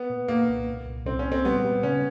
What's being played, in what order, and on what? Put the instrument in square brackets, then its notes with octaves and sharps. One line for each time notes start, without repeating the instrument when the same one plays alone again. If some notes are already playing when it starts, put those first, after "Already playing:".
Already playing: [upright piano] B3
[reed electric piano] A#2
[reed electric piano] A#2 [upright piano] A#3
[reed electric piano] C2
A#2
C2
[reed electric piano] C2 [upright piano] C4
[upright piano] C#4
[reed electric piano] A#2
[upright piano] C4
[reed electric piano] G3 [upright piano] B3
[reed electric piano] G3
[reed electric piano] C#3 [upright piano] C#4